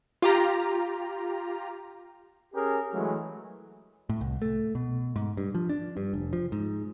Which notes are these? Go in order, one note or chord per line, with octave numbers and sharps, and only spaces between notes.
F4 G4 A#5
C#4 G4 G#4 A#4
E3 F#3 G#3 A3
A2
C2
A3
B2
G#2
G2
F3
D4
G2
F1
F3
G#2